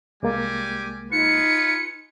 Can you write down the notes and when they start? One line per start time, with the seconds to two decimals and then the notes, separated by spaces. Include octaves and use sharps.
0.23 C2 G3 G#3 A#3 G#5 D6
1.12 D#4 F4 B4 G#5 C#7